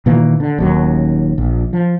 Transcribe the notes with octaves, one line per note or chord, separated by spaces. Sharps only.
A#2 D#3 E3 A#3
D3
D#1 D#2 F#3
A#1
F3